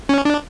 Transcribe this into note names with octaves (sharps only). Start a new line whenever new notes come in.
C#4
D4